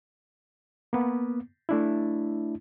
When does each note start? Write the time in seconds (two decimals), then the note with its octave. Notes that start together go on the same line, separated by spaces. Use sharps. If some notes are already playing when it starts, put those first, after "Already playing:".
0.93 A#3 B3
1.69 A3 D4 E4